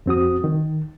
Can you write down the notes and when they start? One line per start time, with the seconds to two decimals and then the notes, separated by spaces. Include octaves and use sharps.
0.06 F2 C4 F#4 D#6
0.44 D#3